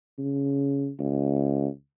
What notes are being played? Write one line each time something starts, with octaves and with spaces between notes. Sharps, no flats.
C#3
C#2